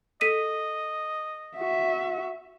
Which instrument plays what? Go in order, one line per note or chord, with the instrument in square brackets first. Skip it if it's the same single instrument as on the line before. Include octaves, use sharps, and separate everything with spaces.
[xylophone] A4 B6 D#7 [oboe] D#5
[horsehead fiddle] F#4 E5